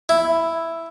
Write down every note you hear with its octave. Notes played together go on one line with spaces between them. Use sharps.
E4